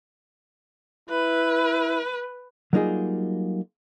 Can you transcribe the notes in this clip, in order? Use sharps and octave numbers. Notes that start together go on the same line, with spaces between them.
E4 B4
F#3 G3 A#3 D#4 F4 G#4